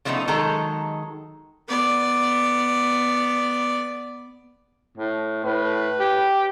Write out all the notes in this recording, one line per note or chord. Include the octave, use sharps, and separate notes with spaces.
C#3 F3 A3 B3 D#4 A4
D#3 F#3 G#3 A4 A#5
B3 D5
A2
A2 B4
G4